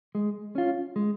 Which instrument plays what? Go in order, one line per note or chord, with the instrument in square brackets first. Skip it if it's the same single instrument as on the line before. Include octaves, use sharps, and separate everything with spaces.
[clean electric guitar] G#3
C#4 F4
G#3